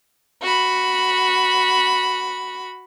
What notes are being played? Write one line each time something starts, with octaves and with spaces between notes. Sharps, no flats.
F#4 B5